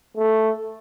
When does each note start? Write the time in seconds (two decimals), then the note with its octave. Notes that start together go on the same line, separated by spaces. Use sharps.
0.17 A3